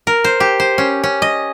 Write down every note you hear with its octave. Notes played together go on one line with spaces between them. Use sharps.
A#4
C5
G4
C5
C#4
C#4
D#5